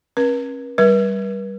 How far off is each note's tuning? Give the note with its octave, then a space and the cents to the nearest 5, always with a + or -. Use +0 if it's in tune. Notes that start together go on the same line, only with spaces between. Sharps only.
C#4 -40 B4 -45
G3 +0 B4 -40